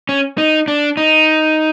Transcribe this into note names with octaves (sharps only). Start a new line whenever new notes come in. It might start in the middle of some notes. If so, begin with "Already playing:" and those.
C#4
D#4
D4
D#4